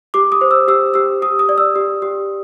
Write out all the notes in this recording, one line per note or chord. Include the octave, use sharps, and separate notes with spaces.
G4 D6
D#6
C5
E6
G4 E6
G4 E6
G4 D#6
D#6
D5
E6
G4
G4